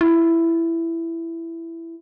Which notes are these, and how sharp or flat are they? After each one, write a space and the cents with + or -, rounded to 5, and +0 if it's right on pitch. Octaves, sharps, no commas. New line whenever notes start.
E4 +10